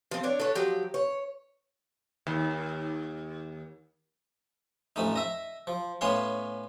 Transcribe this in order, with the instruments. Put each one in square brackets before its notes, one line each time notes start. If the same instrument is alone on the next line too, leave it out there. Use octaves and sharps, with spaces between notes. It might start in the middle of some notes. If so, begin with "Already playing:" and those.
[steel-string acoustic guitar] F3 C4
D4 C#5 D5
A4 B4 C#5
F3 F#3 G4
C#5
[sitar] D#2
[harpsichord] A1 F2 A3 D#4
D#5 E5
F3
A2 B3 C#4 C#5 F5 C6